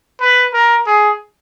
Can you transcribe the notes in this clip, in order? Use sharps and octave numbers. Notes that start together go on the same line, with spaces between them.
B4
A#4
G#4